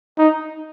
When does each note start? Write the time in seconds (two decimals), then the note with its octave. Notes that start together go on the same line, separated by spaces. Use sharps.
0.18 D#4